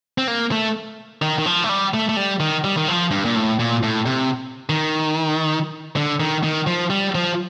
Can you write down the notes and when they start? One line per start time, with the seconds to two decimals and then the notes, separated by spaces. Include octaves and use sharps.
0.18 C4
0.28 A#3
0.52 A3
1.22 D#3
1.38 D#3
1.46 F3
1.64 A3
1.69 G3
1.94 A3
2.09 A3
2.17 G3
2.40 D#3
2.64 G3
2.77 D#3
2.88 F3
3.11 G2
3.25 A#2
3.36 A2
3.60 A#2
3.83 A2
4.06 C3
4.69 D#3
5.96 D3
6.20 D#3
6.43 D#3
6.67 F3
6.90 G3
7.15 F3